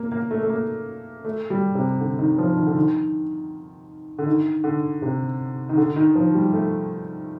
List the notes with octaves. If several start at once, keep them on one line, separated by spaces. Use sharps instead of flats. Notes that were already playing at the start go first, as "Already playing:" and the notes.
Already playing: A#3
A#3
A3
A3
A#3
A3
G3
C3
D3
D#3
F3
D#3
D3
D#3
D3
D#3
D3
C3
D#3
D3
D#3
F3
G3
A3